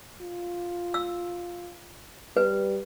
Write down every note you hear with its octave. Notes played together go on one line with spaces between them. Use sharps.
F4
E6
G3 B4